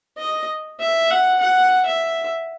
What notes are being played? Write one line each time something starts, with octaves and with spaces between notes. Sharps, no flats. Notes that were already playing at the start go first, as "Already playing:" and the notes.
D#5
E5
F#5
F#5
E5